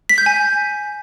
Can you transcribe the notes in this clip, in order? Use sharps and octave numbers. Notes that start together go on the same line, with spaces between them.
B6
G6
G#5